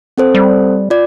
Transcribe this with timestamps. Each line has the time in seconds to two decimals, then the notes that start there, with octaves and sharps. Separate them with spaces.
0.18 C4 A4 C5
0.35 G3
0.90 F4 D5